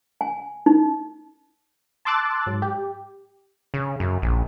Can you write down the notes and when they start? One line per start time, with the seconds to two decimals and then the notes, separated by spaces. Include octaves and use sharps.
0.21 G#5
0.66 D#4
2.05 A5 C6 D6 E6 F#6 A6
2.46 G#2 F#3
2.62 G4
3.74 C#3
4.00 F#2
4.22 A#1